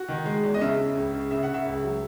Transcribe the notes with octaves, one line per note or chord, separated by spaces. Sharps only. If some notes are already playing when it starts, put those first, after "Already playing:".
Already playing: F#4
D#3
G#3
E2
D#5
C#3 E5
C#3
C#2
C#3
C#3 E5
F#5
C#3
E5
C#2
F#3